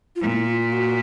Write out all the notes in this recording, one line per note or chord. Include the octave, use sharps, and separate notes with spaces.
F4
A#2 E4
F4
F#4